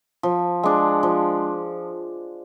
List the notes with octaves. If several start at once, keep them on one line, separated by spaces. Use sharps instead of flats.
F3
G#3 D4
F3